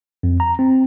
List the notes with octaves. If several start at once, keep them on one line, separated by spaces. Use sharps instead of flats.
F2
A#5
C4